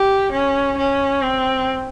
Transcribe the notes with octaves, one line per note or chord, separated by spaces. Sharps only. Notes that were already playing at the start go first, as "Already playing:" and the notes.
Already playing: G4
C#4
C#4
C4